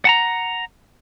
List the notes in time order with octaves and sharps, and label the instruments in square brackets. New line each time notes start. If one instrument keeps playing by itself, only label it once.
[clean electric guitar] F#5 A5 A#5